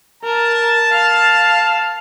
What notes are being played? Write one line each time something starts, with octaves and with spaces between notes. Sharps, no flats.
A#4 A5
F5